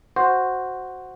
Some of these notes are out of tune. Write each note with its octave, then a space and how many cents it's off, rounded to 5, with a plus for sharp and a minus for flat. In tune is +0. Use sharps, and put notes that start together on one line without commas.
F#4 +0 C5 +0